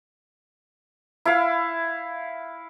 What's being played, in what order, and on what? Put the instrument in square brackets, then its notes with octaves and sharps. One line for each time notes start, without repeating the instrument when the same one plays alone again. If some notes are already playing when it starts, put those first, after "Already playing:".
[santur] E4 F5